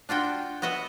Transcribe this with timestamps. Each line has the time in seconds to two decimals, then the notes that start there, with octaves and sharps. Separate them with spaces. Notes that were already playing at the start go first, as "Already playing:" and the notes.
0.09 D4 F4 F#4 G5
0.62 B3 F#4 D#5 E5 F#5